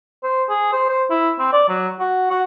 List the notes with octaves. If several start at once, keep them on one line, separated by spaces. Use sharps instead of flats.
C5
G#4
C5
C5
E4
C4
D5
F#3
F#4
F#4